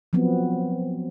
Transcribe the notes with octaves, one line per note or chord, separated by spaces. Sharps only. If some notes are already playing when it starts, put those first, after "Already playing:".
F3 F#3 B3 C4